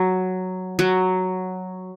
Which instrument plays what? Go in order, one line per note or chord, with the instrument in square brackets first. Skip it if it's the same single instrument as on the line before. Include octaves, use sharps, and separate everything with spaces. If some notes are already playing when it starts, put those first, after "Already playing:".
Already playing: [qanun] F#3
F#3